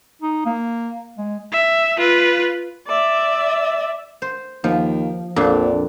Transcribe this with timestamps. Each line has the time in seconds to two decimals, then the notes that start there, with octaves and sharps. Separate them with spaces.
0.22 D#4
0.46 A#3
1.18 G#3
1.52 E5
1.97 F4 B4
2.87 D5 E5
4.22 C5
4.64 D#2 F3
5.36 A#1 F2 A#2 D4